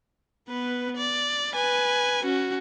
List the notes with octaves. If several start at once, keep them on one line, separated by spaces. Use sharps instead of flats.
B3 B4
D5
B4 G#5
C#4 F#4